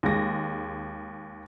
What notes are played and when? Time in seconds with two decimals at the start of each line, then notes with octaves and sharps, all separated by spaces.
0.03 D#2 G#3 A#6